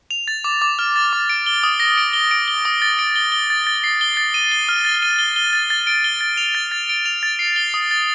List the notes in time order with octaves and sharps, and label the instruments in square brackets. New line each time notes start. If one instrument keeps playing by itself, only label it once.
[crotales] F7
A6
D6
D6
F6
A6
D6
D7
G7
D#6
A#6
D7
G7
D7
G7
D#6
A6
D7
G7
G7
A6
A6
C7
G7
A6
D#7
G7
F6
A6
D#7
G7
G7
A6
A6
D7
G7
A6
F7
A6
A6
D7
F7
A6
C7
G7
D#6
A6